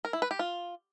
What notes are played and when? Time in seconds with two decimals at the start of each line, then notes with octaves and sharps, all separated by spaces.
0.05 A#4
0.13 E4
0.22 B4
0.31 G4
0.39 F4